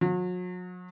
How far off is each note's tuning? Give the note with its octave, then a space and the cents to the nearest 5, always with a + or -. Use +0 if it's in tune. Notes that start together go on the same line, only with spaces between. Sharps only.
F#3 -40